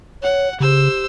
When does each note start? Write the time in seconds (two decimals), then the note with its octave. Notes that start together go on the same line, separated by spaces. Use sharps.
0.23 C#5 F#5
0.60 C#3 G4 C5 E6